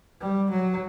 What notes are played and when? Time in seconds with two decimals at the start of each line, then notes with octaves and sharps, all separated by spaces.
0.21 G3
0.50 F#3